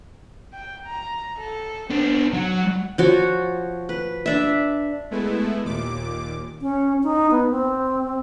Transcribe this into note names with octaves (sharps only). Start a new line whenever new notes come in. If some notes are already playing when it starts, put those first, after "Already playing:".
G5
A#5
A4
B3 C4 D4
F#3 F#5
F3 F#4 C#5
B4
D4 E5
G#3 A3 B3 E4
D#2 A#2 D6
C#4
D#4
B3
C4